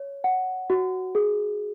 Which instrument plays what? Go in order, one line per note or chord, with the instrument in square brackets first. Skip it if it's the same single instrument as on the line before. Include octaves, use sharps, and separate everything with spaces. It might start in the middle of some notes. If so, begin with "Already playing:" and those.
Already playing: [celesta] C#5
F#5
F#4
G#4